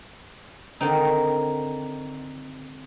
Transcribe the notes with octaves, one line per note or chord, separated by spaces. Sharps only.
D3 D#3 C4 D#4